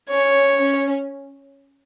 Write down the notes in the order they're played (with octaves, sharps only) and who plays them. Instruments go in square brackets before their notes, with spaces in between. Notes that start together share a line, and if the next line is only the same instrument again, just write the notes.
[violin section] C#4 [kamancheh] C#5
[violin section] C#4